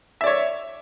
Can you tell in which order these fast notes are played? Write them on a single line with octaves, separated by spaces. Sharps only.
E5 D5 C#5